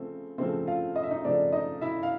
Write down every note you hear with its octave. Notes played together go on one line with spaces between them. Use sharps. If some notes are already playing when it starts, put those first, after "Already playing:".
Already playing: C#3 F3 A3 C4
C#3 F3 A3 C4 C5
F4 F5
D#5
E5
D#4 D#5
C#3 F3 A3 C4 D4 D5
D#4 D#5
E4 E5
F5